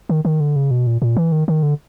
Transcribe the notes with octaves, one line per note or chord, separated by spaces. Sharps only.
D#3
D#3
D3
C#3
B2
A#2
A#2
E3
D#3
D#3
D3